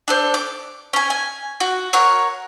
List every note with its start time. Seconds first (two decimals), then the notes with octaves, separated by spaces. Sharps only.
0.08 D4 A4 C5
0.34 D6
0.93 C#4 G#5
1.10 G#5
1.60 F#4
1.93 A#4 C#5 F#5